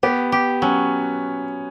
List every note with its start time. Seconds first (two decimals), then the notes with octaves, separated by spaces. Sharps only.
0.03 B3 G4
0.32 G4
0.62 F#3 C#4